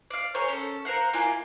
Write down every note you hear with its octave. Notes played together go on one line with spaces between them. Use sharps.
D5 F5
G#4 A#4 C5 C#5
C#4 A4
A#4 C5 F5 F#5
A#3 E4 F4 G#5